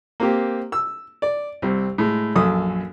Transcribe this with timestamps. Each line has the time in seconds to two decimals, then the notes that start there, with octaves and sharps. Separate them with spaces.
0.20 A#3 C4 G4
0.72 E6
1.22 D5
1.62 C2 C4
1.98 A2 G#3
2.36 A#1 F#2 A4 D#6